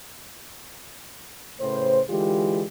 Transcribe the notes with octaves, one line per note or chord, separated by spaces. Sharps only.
A2 C#3 B4 C5
D3 E3 G#3 F4 G4